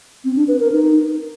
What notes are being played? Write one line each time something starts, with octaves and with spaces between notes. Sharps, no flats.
C4
D4
B4
A#4
D#4